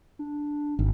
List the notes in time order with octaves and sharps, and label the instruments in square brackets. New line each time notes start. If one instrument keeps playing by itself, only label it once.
[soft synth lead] D4
[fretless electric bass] G#1